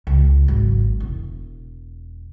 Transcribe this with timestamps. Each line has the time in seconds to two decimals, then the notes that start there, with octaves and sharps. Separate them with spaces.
0.07 C#2
0.48 G#1 F#3
1.00 E1